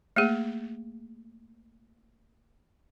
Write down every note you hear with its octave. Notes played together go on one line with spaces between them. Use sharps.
A3 A#3 G#4